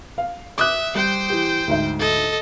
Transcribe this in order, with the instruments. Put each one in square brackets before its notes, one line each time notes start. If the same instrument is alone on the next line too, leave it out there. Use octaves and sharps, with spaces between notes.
[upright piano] F5
[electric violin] E5 [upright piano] D6 D#6 F#6
[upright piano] G3 [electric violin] C5 G5
[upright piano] E3 G4
D2 G#2 E5
[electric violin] A4 D#5